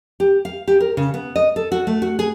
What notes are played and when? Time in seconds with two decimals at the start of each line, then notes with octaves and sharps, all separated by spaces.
0.20 G4
0.45 F5
0.68 G4
0.80 A#4
0.97 C#3
1.14 B3
1.36 D#5
1.56 A4
1.72 F#4
1.87 A3
2.02 F#4
2.19 G#4